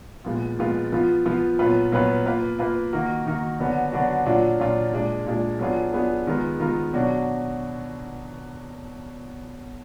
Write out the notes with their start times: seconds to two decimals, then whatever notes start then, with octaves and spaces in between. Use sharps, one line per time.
0.25 A#2 F3 G#3 B3 F4
0.59 A#2 F3 G#3 B3 F4
0.92 F3 B3 F4
1.26 F3 B3 F4
1.59 A#2 F#3 B3 F4 B4
1.92 A#2 F#3 B3 F4 B4
2.26 A#3 F4 B4
2.59 A#3 F4 B4
2.92 D#3 A#3 D#4 F#4 A#4
3.26 D#3 A#3 D#4 F#4 A#4
3.59 D3 F#3 B3 D4 F#4
3.92 D3 F#3 B3 D4 F#4
4.26 A#2 F#3 D4 F4
4.60 A#2 F#3 D4 F4
4.92 A#2 G#3 D4
5.26 A#2 G#3 D4
5.59 F#3 B3 D4 F4 G#4
5.93 F#3 B3 D4 F4 G#4
6.27 D#3 G#3 B3 F4 A#4
6.60 D#3 G#3 B3 F4 A#4
6.93 B2 F#3 D4 F#4